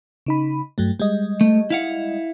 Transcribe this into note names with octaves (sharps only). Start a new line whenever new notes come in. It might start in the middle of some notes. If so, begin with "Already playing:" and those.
C#3 D#4 B5
G2 F#3 A3
G3 G#3 D#5
A3
E4 F5 F#5